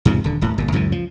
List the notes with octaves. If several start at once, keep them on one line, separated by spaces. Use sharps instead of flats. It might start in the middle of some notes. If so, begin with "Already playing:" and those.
E2 G#2 C3 F3
D#1 D3
D#1 A2
G1 A#2
C#2 F#2 A2 E3
F3